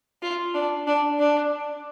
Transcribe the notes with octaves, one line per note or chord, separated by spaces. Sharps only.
F4
D4
D4
D4